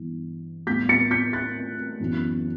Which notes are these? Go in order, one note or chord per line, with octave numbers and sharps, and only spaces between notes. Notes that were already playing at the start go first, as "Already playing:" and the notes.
Already playing: G2 E3 B3
A2 G3 B3 G6 B6
A6 C#7
G6 B6
F#6 A6
F#2 E3 B3